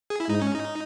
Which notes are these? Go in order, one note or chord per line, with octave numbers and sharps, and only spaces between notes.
G#4
E4
G#2 D#4
C#4
D#4